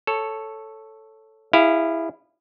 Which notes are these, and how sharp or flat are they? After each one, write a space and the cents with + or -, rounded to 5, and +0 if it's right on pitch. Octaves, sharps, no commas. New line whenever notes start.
A4 +0 C#5 -5
E4 +0 G#4 -35 F5 -15